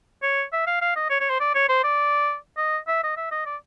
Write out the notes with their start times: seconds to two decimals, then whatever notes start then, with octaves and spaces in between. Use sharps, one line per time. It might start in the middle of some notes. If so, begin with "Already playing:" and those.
0.23 C#5
0.52 E5
0.67 F5
0.82 F5
0.96 D#5
1.10 C#5
1.21 C#5
1.30 C5
1.40 D5
1.55 C#5
1.69 C5
1.84 D5
2.57 D#5
2.88 E5
3.04 D#5
3.17 E5
3.32 D#5
3.46 D5